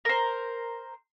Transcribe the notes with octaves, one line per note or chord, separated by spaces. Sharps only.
A#4 C5